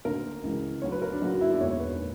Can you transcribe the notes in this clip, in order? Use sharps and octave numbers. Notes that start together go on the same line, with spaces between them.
D2 D3 A#3 A#4
C#2 C#3 E3
D2 D3 F#3 C#5
B4
A#4
D4
F#1 F#2 D3 A#3 F#4
F#4
E4
D4
E1 E2 D3 A#3 C#5
C#5
B4
A#2